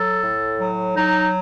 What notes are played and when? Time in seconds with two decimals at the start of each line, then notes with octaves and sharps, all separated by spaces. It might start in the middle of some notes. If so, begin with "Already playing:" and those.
Already playing: F#3 A4
0.22 A2
0.59 F#3
0.97 F#3 D#4